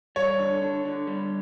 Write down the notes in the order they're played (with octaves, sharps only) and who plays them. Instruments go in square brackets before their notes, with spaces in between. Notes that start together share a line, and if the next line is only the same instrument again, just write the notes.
[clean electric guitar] G3 [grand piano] C#5
[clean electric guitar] D3
D3
D3
G3